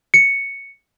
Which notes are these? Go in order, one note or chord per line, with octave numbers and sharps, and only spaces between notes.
C#7